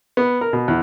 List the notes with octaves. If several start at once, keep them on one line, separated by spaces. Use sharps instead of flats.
B3
A#4
B2
E2